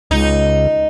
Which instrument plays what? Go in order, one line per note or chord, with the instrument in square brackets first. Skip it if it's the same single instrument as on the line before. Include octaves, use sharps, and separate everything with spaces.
[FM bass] C#2 [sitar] D#4